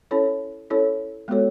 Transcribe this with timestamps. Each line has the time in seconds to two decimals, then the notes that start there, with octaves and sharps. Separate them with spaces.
0.11 C#4 E4 A4 C#5
0.70 C#4 E4 A4 C#5
1.28 G#3 B3 F#4 A4 C#5